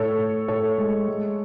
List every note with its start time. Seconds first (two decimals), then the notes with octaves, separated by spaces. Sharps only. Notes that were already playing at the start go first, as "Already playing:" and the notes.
Already playing: A2 A4 C#5
0.18 A2
0.48 A2 A4 C#5
0.78 G#3
1.08 G#3